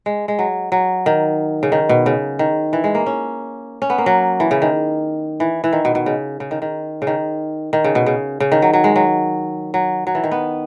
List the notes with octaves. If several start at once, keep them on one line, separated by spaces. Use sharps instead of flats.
G#3
G#3
F#3
F#3
D#3
C#3
D#3
B2
C#3
D#3
E3
G#3
A#3
C#4
C#4
B3
A#3
F#3
E3
C#3
D#3
E3
E3
D#3
B2
B2
C#3
C#3
D#3
D#3
C#3
D#3
D#3
C#3
B2
C#3
C#3
D#3
F#3
F#3
G#3
F#3
F#3
F#3
E3
D#3
B3